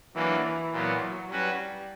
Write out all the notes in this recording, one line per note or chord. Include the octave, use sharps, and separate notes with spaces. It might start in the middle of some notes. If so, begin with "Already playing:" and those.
E3 F#3 A#3 D4
E3
A#2 F#3 B3
F#3
F#3 G3 C#4 F#4 B4